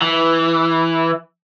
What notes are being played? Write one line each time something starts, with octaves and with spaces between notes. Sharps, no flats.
E3